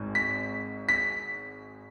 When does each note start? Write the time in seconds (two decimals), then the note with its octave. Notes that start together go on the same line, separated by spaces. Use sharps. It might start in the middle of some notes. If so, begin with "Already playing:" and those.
Already playing: G#1 G#2
0.15 B6
0.89 B6